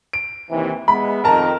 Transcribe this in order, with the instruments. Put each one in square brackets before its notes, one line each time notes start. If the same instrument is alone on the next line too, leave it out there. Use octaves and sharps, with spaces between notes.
[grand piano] D7
[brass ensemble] D#2 C3 E3
[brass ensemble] G#3 B3 E5 [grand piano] B5
[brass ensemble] F2 D#3 [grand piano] A#4 A5 A#5